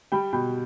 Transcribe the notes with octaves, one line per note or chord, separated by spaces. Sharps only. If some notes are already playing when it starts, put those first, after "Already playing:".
G3 G5 B5
B2 G5 B5